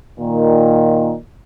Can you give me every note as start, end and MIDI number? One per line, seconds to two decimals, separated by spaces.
0.20 1.13 46
0.20 1.13 51